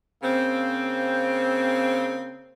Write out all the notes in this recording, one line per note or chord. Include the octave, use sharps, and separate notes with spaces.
C#3 A#3 C4